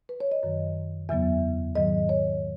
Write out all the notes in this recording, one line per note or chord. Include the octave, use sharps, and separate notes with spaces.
B4
C#5
D#5
F#2 D#3 F#3
E2 C#3 F#3 B3 E5
G#2 D#3 F#3 D#5
C#5